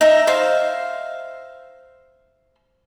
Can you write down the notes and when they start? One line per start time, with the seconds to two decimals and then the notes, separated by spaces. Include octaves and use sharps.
0.01 D#4 E5 A#5
0.27 C5 E5 F5